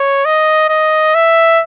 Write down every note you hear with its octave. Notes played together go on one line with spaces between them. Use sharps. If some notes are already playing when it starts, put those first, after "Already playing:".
Already playing: C#5
D#5
D#5
E5